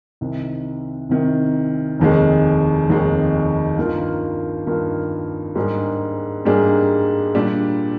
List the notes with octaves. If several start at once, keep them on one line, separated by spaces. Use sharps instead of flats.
C2 C3 D#3
C2 C3 D#3
F1 D#2 D#3 G#3
F1 D#2 D#3 G#3
G2 D#3 A#3 F4
G2 D#3 A#3 F4
G#2 G3 A#3 D4 G#4
G#2 G3 A#3 D4 G#4
A#2 G3 D4